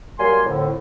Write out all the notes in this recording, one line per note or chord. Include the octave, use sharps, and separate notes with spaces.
F#3 G3 A#3 G#5 C6
F2 A2 D3